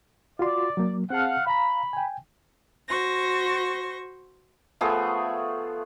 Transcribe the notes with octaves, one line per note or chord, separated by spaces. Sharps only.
F4 F#4 D5 C6
F#3 A#3
C4 G#4 F5 F#5 A5
F5 A#5 B5
G5 G#5
F#4 C5 C#6 A#6
F3 A3 B3 G#4